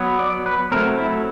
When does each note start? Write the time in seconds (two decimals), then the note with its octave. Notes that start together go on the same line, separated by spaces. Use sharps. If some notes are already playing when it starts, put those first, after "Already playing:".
Already playing: F#3 B3
0.19 D5
0.46 B4
0.72 F#3 A3 C4 A#4
0.98 E4